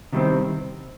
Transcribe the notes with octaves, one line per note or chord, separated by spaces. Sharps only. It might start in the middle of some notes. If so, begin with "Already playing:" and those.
C3 D#3 G3 C4